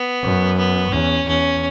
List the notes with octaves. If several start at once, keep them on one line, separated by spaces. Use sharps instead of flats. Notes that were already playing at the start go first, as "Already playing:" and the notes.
Already playing: B3
F#2
B3
E2 C#4
E2 C#4